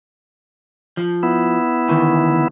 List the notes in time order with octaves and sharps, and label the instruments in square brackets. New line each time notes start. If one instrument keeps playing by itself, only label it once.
[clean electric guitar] F3
[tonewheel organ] B3 E4
[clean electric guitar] D2 D#3 E3